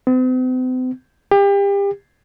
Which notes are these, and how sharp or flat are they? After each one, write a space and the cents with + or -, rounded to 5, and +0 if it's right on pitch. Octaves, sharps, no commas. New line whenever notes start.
C4 -45
G4 +30